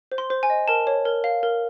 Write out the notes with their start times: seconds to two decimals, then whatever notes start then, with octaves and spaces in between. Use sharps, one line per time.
0.12 C5
0.18 C6
0.30 C5
0.43 G#5
0.50 D#5
0.68 A#4 A5
0.87 C#5
1.05 A#4
1.24 F5
1.43 A#4